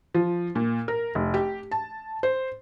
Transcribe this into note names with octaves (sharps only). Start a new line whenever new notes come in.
F3
A#2
A#4
F1
G4
A5
C5